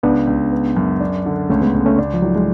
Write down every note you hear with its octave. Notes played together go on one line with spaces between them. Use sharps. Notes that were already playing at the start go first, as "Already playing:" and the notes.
C#2 B3 D4
C#2
B3
F#2
D4
D3
C#2 A3 C#4
G#3 B3
C#2
A3 C#4
D4
F3
A2 F#3
G#3